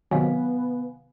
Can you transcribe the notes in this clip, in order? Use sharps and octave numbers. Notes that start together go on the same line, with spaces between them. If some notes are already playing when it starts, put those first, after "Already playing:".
C3 D#3 F#3 B3 F5 G#5